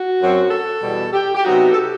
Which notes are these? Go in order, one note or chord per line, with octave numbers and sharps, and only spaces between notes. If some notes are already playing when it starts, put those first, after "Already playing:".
Already playing: F#4
F#2 F#3 C4
A4
E2 B2 G3
G4
G4
C3 F#3 B3 D#4 F#4
A4
G4